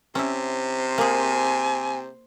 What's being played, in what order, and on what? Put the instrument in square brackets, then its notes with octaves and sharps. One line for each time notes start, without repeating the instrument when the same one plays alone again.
[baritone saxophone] C3 [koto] C#4 E4 [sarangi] C5
[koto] A#3 G#4 [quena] G#5